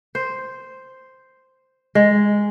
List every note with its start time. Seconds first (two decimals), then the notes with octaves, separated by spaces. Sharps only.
0.15 C5
1.95 G#3